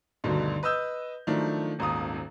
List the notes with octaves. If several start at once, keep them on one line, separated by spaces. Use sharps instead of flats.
D2 G2 B2 D3 D#3
B4 D#5 D#6 E6 G6
D#3 F3 F#3 A3 D4
D#1 G#1 D#2 A#5 D#6